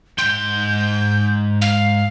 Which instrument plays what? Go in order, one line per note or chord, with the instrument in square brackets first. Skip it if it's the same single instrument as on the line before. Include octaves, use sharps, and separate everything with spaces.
[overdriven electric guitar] G#2 C6 [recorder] G6
[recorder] F5